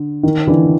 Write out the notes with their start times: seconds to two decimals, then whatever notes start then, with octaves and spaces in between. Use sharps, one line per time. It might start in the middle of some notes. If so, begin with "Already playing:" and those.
Already playing: D3
0.23 D#3
0.47 D3 E3